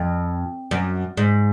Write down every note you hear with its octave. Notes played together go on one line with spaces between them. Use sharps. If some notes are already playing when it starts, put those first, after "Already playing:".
Already playing: F2
F#2
G#2